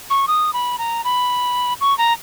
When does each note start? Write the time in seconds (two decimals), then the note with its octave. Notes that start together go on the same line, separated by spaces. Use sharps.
0.10 C#6
0.28 D#6
0.53 B5
0.78 A#5
1.04 B5
1.81 C#6
1.98 A#5